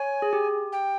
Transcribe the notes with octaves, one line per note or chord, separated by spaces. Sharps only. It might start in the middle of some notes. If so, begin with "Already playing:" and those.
Already playing: C#5 G#5
G#4
G4
G5